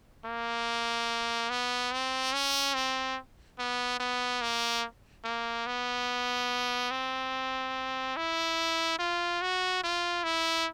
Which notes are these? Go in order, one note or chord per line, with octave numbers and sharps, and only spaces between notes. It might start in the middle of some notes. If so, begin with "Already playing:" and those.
A#3
B3
C4
C#4
C4
B3
B3
A#3
A#3
B3
C4
E4
F4
F#4
F4
E4